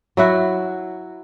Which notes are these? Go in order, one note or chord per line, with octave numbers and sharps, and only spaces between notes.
F#3 E4 F#4